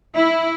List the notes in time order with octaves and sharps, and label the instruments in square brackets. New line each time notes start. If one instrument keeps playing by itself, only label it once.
[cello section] E4